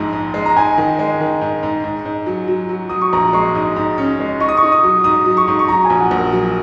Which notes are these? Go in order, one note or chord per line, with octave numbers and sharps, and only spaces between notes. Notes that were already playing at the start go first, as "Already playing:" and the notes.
Already playing: A#1 G#2 G#3 D#5
G#2
G#3
A#5
G#2 G#5
D#3
G#3
D#3
G#2
G#2
G#2
G#2
F#3
F#3
F#3
F#3 D#6
C#6
A#1 A#5
G#3 C#6
G#2 D#6
G#2
C#4
G#3
D#4 C#6
D#6
C#6
D#4
D#6
F#3
G#2 D#6
F#3
C#6
G#2
C#6
F#3 A#5
G#5
A#1
F#5
A#1
A#4
F#3